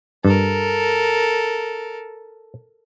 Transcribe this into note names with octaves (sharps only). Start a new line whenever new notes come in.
G2 A4 A#4